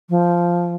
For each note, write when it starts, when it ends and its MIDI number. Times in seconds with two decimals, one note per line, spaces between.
0.10 0.75 53